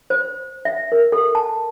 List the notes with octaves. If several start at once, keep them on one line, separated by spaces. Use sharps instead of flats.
C5
E5
A#4
A4
A5